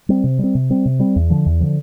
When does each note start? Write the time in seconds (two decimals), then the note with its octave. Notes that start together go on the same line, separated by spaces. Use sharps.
0.09 G3 C4
0.24 C3
0.39 G3 C4
0.55 C3
0.70 G3 C4
0.86 C3
1.00 G3 C4
1.16 E2
1.30 D3 F3
1.46 E2
1.61 D3 F3